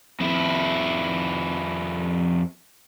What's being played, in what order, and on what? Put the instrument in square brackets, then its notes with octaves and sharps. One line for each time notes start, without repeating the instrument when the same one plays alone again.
[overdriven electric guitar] F2 E4